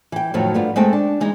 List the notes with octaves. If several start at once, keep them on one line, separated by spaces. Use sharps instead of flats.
E3 G5
F2 A2 D#3 F3 F#3
G2 A3 B3 F4
G#3 A3 C4 E5 G5 A5
D4
E3 G#3 D#4